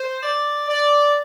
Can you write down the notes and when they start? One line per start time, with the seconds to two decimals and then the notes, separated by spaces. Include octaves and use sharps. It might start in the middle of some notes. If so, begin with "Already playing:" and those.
Already playing: C5
0.23 D5
0.68 D5